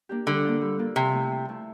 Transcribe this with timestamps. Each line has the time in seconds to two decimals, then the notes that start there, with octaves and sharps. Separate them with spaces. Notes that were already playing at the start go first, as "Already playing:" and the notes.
0.09 A#3 D4 G4
0.26 D3 G3
0.44 A#3 F4
0.62 G3
0.79 A#3 F4
0.96 C3 F3
1.13 A3 E4
1.31 F3
1.49 A3 E4